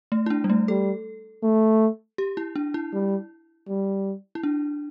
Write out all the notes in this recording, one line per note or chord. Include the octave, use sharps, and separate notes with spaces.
A3
E4
D4
G3
A3
G3 A4
A3
G4
E4
D4
E4
G3
G3
E4
D4